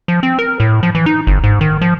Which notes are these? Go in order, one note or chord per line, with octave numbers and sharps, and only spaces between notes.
F3
C4
A#4
A2
F3
E3
D#4
G1
G#2
D#3
F3